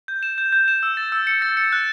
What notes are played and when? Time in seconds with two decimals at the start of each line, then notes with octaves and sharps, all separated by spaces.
0.08 G6
0.23 E7
0.38 G6
0.52 G6
0.68 E7
0.83 E6
0.97 A6
1.12 E6
1.27 C#7
1.42 A6
1.57 C#7
1.72 F#6